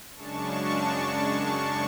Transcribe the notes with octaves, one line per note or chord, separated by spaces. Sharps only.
F#2 C#3 G#3 D4 A5 C#6